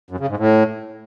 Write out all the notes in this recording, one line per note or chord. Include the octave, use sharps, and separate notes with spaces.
F#2
C#3
G#2
A2